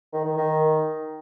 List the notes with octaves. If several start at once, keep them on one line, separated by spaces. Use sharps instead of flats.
D#3
D#3
D#3